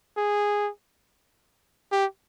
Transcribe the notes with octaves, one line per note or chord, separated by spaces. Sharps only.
G#4
G4